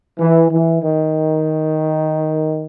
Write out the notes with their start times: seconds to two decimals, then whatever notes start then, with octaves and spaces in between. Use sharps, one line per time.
0.20 E3
0.50 E3
0.80 D#3